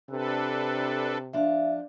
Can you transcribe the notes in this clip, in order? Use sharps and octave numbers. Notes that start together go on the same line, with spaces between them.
C3 D4 A4 B4
F3 D4 E5 F5